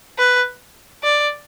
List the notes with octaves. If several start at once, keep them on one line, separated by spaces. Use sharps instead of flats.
B4
D5